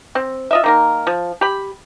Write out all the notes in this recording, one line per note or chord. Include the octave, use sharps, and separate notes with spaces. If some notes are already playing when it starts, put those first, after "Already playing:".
C4
F4 D#5 E5
D#3 A#3 A#4
F3
G4 B5